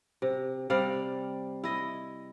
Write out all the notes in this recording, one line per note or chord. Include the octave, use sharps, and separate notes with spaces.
C3
C3 G3 D5 F5
E4 D#5